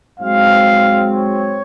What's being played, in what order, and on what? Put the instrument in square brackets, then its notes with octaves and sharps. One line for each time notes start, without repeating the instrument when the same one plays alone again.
[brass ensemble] G#2 F#3 C4 F5
C#5